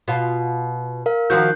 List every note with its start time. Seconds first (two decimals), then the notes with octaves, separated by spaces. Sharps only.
0.08 B2 F4
1.06 A#4 F5
1.30 D#3 F3 F#4 F#6 G6